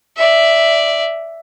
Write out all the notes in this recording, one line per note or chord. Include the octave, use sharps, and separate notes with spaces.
D5 E5